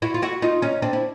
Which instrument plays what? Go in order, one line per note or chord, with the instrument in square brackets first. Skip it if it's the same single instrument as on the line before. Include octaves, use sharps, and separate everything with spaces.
[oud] E4 F#4
F4
E4 F#4
D#4 F4
C#4 D#4
C4 D4
E4